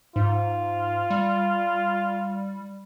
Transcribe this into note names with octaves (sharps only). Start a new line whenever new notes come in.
G#2 F4
G3